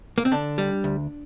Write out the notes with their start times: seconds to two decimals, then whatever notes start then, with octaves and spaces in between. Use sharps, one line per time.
0.18 A#3
0.25 C4
0.32 D3 D4
0.58 G3
0.84 D2